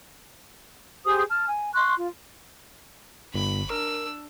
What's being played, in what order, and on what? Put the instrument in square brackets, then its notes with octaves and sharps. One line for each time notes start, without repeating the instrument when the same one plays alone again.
[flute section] G4 G#4 C5 D#6
A5 F6
G#5
C6 C#6 F#6
F4
[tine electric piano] G1 [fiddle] B5
[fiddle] D4 E6 [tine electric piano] A#4